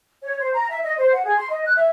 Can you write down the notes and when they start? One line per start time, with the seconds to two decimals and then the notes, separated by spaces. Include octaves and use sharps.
0.22 C#5
0.39 C5
0.53 A#5
0.70 E5
0.83 D#5
0.98 C5
1.13 F#5
1.25 G#4
1.38 C6
1.49 D#5
1.65 F#6
1.77 E5